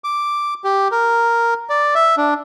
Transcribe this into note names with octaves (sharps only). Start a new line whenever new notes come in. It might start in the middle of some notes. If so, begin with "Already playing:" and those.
D6
G4
A#4
D5
E5
D4